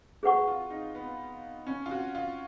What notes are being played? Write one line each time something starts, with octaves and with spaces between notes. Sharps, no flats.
F#4 G#4 B4 F#5 C#6
F4
D#4
B3
C#4
F4
F#4
F4